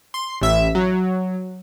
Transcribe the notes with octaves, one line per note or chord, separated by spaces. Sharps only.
C6
A1 E5
F#3